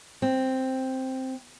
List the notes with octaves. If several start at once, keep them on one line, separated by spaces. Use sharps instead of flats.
C4